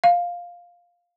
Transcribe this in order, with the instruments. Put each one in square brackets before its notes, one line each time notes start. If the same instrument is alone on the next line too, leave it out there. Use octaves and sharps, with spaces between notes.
[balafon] F5